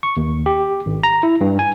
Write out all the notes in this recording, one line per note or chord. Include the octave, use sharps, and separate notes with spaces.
C#6
D#2
G4
G#1
A#5
E4
G2
G#5